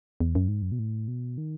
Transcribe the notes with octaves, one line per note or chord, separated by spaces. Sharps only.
E2
F#2
G#2
F#2
B2
A2
B2
D#3